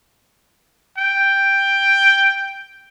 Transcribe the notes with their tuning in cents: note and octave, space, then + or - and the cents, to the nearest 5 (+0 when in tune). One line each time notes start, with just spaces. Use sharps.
G5 +5